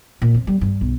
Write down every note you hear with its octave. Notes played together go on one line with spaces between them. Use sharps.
A#2
F2
G3
G2
B1